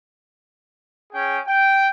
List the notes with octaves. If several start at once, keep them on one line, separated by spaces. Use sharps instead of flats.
C#4 G#4 G5
G5